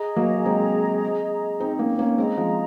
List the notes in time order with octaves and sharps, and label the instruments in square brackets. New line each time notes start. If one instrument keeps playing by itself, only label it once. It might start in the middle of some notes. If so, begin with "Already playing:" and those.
Already playing: [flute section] G#4 D#5 A#5
[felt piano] F#3 A#3
G#3 C4
C4 D#4
A#3 C#4
A#3 C#4
[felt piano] G#3 C4 [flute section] G#4 D#5 A#5
[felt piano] F3 G#3